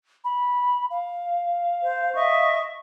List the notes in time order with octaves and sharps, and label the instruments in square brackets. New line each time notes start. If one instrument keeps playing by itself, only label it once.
[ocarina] B5
F5
[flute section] C5
D#5 E5 C#6